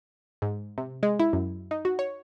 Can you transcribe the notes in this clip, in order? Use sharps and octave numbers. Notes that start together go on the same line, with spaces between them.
G#2
C3
G#3
E4
F#2
D#4
F#4
C#5